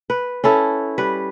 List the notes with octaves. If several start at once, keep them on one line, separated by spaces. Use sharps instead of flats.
B4
C#4 E4 A4
G3 B4